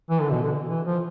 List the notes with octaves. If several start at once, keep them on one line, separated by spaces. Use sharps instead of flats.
E3
D3
B2
D3
E3
F3